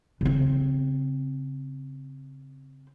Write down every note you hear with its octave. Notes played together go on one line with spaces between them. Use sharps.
C#3 C4